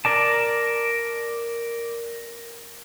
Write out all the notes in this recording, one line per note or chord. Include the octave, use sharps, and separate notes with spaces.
A#4 D5 A5